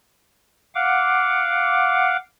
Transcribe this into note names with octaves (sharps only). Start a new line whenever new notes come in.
F5 F#5 D6